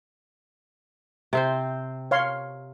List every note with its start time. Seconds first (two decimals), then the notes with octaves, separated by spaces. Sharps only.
1.33 C3 C4 C5
2.11 C#5 F5 C6